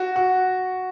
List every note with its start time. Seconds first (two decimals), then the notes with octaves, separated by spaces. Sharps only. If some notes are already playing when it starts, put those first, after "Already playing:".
Already playing: F#4
0.16 F#4